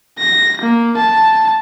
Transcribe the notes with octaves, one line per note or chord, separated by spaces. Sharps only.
A#6
A#3
A5